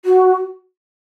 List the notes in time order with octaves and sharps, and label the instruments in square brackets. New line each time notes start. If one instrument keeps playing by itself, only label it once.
[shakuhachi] F#4